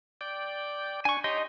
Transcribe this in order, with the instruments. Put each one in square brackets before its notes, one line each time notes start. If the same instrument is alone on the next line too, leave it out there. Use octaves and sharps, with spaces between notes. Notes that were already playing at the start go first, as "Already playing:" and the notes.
[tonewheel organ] D5 G5
[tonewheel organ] D4 [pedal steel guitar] G#5 C#6
[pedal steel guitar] D#4 D#5 C6 [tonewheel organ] G4 C#5 G5